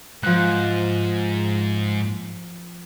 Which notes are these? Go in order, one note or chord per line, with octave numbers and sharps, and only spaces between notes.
G#2 F3 F#6